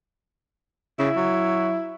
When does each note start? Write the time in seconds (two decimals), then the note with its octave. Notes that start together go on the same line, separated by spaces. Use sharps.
0.99 C#3 E4
1.16 F#3